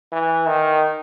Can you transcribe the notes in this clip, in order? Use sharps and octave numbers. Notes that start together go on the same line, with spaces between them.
E3
D#3